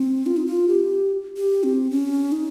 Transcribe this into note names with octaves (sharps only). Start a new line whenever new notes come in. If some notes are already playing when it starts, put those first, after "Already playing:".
Already playing: C4
F4
D#4
F4
G4
G4
C4
C#4
D#4